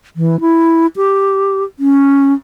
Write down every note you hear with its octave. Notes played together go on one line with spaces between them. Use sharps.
E3
E4
G4
C#4